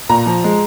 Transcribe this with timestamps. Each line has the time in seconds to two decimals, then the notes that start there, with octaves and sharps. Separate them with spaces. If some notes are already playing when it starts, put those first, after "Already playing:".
0.09 A#2 A#5
0.26 F3
0.44 G#3